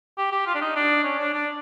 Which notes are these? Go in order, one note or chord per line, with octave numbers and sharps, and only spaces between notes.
G4
G4
F4
D4
D#4
D4
C#4
D4
D4